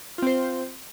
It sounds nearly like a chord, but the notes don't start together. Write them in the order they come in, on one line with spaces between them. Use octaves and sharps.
F4 C4 C5